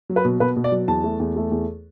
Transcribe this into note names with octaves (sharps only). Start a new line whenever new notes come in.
F#3
B4
B2
B2 B4
B2
D5
F#3
E2 A5
A3
E2
A3
E2